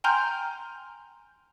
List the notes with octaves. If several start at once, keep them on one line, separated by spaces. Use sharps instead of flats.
G5 G#5 A#5 C6 F6 G6